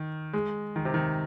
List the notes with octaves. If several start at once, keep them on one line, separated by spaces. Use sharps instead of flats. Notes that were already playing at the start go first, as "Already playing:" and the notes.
Already playing: D#3
G#3
D#3
C3
D#3